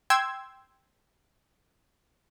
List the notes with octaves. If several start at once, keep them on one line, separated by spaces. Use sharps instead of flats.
G5 C6 E6 G#6